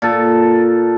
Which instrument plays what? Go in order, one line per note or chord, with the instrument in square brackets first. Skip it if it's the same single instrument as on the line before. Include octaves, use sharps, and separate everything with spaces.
[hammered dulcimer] A#2 A4